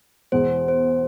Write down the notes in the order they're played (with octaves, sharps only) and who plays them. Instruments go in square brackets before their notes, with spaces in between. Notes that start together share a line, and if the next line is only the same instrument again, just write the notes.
[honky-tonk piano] E2 B2 G#3 [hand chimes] C5
[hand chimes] C5